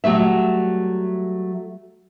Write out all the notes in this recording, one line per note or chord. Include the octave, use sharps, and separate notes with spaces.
F#3 G3 A3 E5